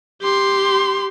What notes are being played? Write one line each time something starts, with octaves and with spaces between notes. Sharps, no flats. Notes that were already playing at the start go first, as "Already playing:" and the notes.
G4 C6